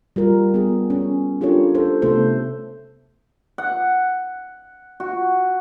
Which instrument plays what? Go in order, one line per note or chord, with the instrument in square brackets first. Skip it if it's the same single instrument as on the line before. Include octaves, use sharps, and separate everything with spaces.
[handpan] G3 F4 A#4
B3 G#4
C#4
D4 F4 G4 A4 A#4 C#5
A4 C5
C3 A3 B3 A4 C5
[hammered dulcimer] F#5
F#4